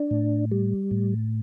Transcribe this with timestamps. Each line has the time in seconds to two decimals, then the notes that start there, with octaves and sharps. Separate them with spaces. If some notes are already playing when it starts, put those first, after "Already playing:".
Already playing: D4
0.11 A2
0.52 G3
0.91 A2